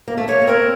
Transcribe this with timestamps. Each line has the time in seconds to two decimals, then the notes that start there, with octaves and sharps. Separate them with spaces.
0.08 A#3
0.17 A3
0.28 A#3 C#5
0.42 A#3
0.47 C4 A#4